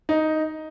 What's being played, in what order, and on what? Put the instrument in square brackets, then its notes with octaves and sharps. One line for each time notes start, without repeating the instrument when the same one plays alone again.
[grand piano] D#4